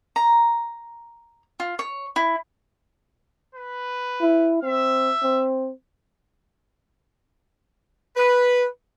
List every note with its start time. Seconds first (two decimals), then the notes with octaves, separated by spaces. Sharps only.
0.16 A#5
1.60 F4
1.79 C#5
2.16 E4
3.55 B4
4.21 E4
4.63 C4 E5
5.23 C4
8.16 B4